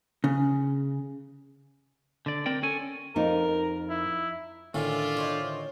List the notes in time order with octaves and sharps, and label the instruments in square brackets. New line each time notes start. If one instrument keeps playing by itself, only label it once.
[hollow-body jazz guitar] C#3
[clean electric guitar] D3 D5
C4 A#4 D5 G5
C#4 A4 G#5
[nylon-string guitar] F2 D#4 [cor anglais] A#4
[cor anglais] E4
[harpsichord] A2 D#3 C#4 [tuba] D3 [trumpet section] F4 D5 E5
[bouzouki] D#4 C5 C#5